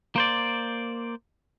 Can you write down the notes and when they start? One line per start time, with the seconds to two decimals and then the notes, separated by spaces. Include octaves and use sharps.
0.16 A#3 C5 D5